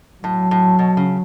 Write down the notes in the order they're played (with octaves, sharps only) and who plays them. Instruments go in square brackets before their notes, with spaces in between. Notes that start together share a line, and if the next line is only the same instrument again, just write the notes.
[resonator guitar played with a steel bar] A2 [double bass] F#3
[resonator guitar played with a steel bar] A2
B2
C#3